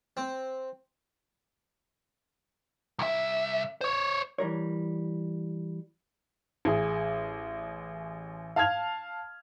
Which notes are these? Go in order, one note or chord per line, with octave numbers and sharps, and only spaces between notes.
C4
C2 E5
C5 C#5
E3 G3 A#4 C#5
A1 G#4
F5 A5 F6 G#6 F7